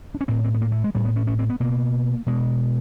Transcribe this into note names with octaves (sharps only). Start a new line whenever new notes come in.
D4
C#4
A2 C4
C4
B3
A#3
A3
G#3
A2 G3
B3
C#4
C#4
C4
B3
B2 A#3
B2 G#3